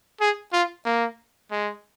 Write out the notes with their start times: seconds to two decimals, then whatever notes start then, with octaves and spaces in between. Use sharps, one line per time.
0.21 G#4
0.53 F4
0.85 A#3
1.51 G#3